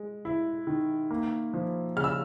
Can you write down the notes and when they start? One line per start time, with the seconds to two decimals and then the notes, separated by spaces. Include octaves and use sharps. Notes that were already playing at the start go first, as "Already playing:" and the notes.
Already playing: G#3
0.25 E4
0.67 D#3
1.11 A#3
1.54 F3
1.96 C#3 F6
2.04 E6